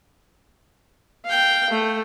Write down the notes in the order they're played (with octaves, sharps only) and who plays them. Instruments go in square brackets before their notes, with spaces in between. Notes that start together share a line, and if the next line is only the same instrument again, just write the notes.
[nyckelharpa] F5 G5
A3